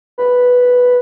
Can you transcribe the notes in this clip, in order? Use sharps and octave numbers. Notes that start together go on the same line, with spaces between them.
B4